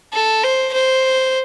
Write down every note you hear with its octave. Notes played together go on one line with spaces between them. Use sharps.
A4
C5
C5